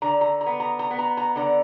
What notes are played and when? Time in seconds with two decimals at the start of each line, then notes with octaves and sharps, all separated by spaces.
0.02 D3 A#5
0.21 A#5
0.41 A#5
0.46 B3
0.60 A#5
0.79 A#5
0.91 B3
0.99 A#5
1.17 A#5
1.36 D3 A#5